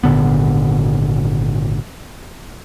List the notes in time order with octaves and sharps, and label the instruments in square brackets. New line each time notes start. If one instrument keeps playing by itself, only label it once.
[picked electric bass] G#1 A#2 D3 B3